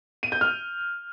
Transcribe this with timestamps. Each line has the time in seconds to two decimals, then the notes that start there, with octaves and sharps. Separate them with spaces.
0.23 D#7
0.32 G6
0.41 F6